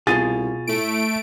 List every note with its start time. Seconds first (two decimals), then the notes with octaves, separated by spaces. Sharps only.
0.07 C2 B2 F4 G#4 A6 D#7
0.67 A2 A3 D7